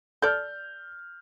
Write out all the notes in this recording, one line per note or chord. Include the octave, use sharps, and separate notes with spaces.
A4 D5 F6 G6